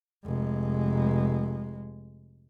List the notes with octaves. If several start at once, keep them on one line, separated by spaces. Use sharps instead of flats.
F1 G#3